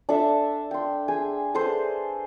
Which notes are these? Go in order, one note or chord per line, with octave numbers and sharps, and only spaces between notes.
D4 A4 E5
G5 C6
G#4 G5 G#5
G#4 A4 B4 C5